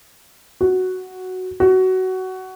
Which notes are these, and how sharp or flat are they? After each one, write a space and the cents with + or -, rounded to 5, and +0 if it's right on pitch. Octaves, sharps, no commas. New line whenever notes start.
F#4 +0
F#4 +15